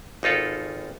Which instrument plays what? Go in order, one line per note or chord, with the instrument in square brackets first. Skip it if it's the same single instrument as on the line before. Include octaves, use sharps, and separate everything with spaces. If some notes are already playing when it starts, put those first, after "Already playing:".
[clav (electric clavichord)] G#1 D#4 F4 A4 F#5